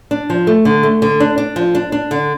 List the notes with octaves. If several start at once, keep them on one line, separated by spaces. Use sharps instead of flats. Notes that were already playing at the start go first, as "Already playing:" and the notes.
D4
F3
A3
D3
A3
D3
D4
D4
F3
D4
D4
D3